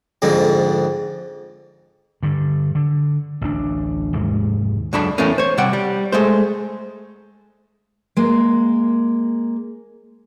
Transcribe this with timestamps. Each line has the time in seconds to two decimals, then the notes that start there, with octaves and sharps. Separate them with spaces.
0.22 F2 G#2 D3
2.23 G2 D3
2.75 D3
3.41 A1 D2 D4
4.13 F1 D#2 G#2 G#3
4.93 C#2 F#2 D4 A4 B5
5.18 E2 A2 A3 A#3 C#4
5.38 C5 C#5
5.58 C3 G3 F#5 G5
5.73 G3
6.12 G#3 A3 C5
8.17 G#3 A#3